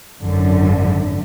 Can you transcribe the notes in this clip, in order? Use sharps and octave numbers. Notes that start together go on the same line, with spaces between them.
G#1 F#2 D3